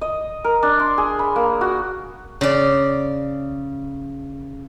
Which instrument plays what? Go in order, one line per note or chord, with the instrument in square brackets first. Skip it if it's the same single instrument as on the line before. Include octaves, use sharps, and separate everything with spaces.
[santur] D#5
A#4
D4
C6
G#4
B5
A#3
F#4
[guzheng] C#3 D5